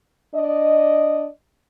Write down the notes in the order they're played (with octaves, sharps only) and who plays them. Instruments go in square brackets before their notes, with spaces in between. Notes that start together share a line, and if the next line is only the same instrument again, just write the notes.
[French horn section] D4 D5 D#5